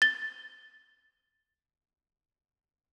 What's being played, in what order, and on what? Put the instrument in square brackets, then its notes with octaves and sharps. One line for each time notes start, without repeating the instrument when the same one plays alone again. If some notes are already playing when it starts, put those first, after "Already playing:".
[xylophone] A6 G7